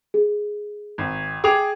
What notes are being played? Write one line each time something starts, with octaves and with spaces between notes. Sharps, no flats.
G#4
G#1
G#4 G5 D6 F7